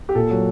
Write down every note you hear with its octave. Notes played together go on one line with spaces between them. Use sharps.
G4
A#2 A4
F#3